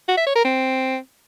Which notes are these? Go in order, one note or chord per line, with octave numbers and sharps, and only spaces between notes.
F#4
E5
C#5
A#4
C4